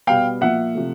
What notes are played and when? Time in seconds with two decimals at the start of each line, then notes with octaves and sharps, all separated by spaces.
0.07 B2 G3 B3 F5 G5
0.41 A#2 F3 A#3 E5 F#5
0.75 C3 F3 A3